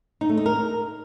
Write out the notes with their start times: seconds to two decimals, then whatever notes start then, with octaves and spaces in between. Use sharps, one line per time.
0.21 D#4
0.29 A3
0.37 D#4
0.46 A#4